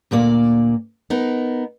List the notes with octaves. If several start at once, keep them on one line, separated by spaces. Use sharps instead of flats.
D2 A#2 A#3 D5
B3 D#4 A#4